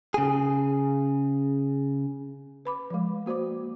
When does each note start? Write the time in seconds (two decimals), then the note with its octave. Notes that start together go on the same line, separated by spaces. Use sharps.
0.14 C#3 G#4
2.65 B4 B5 D6
2.90 F3 G#3
3.26 A#3 F#4 C5 D5 D6